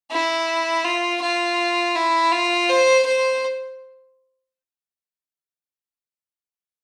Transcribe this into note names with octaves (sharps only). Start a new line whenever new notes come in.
E4
F4
F4
E4
F4
C5
C5